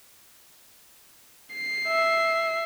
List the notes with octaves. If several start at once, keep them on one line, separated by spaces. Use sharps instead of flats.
C7
E5